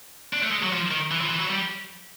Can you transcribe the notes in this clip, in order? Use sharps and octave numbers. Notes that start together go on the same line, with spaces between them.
D4
A3
G#3
F#3
F3
D#3
E3
F3
E3
F#3
G3